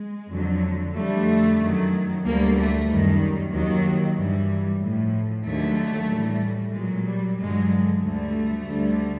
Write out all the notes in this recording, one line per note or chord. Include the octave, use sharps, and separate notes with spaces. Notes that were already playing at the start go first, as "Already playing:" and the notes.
Already playing: G#3
F2 D3 F#3
F2 D3 G3 A3
F#2 D#3 F#3
D2 D3 G3 A#3
A3
F#2 D#3 G3
D#2 D#3 F#3
G2 E3 G3
A2 F3
D#2 D3 F#3 A3
A2 E3 G3
A#2 F#3 G#3
G3
G2 D3 F#3 G#3
D2 D3 G3 A3
D2 D3 G3